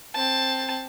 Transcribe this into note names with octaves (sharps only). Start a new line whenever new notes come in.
C4 A5